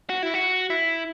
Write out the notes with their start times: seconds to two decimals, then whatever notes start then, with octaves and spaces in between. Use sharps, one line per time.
0.10 F#4
0.23 E4
0.34 F#4
0.70 E4